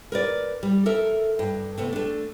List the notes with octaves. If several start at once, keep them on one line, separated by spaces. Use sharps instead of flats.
A#4 B4 D5
G3
A4 A#4 E5
G2
C3 A3 B3
A3 D4